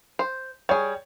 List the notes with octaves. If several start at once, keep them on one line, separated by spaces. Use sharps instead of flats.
C5
G3 G#4 C#5